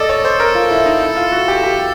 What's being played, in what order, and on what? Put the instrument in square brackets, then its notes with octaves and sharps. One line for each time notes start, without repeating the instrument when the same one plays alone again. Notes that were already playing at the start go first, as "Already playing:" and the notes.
Already playing: [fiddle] A4 [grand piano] D5 D#5
[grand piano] C#5
C5
A#4
F4
E4
D#4
E4
F4
F#4
G4
G4